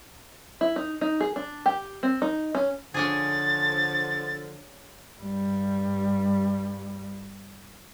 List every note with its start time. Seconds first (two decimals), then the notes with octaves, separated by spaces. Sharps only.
0.61 E4
0.76 D#4
1.01 D#4
1.20 G#4
1.36 D4
1.66 G4
2.03 C4
2.22 D#4
2.55 C#4
2.94 D3 F3 C#4 D4 G#4 A6
5.20 G2 G3